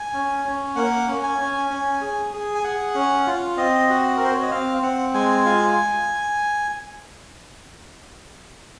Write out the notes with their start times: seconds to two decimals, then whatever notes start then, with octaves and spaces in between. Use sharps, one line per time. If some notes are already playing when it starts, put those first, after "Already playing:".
Already playing: G#5
0.14 C#4
0.45 C#4
0.76 A#3 F#5
1.07 C#4
1.23 G#5
1.39 C#4
1.70 C#4
2.01 G#4
2.33 G#4
2.55 G#5
2.63 G#4 F#5
2.95 C#4
3.27 F4
3.57 C4 D#5
3.89 F#4
4.17 C4 A#4
4.25 C5
4.34 C#5
4.42 D#5
4.51 C4 F5
4.82 C4 F#5
5.14 G#3 G#5
5.46 F4